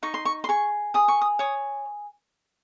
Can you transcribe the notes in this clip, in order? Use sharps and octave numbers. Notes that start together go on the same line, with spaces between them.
D#4 C#6
C6
C#6
C6
G#4 C#6
G#4 D#6
C#6
D#6
C#5 D#6